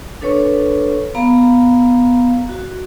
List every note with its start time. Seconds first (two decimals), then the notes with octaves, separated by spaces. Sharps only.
0.21 D4 A4 B4 C#5 C#6
1.15 B3 F5 A#5
2.49 F#4